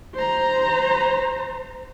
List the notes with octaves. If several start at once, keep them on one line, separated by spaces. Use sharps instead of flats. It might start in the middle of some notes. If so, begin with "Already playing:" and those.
C5 A#5